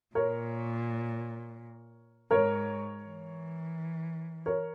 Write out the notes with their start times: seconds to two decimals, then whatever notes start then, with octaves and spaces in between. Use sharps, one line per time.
0.15 A#2 A#4 C#5
2.31 G#2 A#4 C#5
3.03 E3
4.46 A#4 C#5